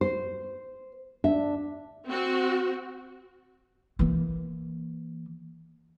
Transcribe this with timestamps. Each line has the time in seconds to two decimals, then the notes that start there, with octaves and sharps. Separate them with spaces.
0.01 C5
1.24 D4 E5
2.07 C4 F#4
3.99 E3 A#3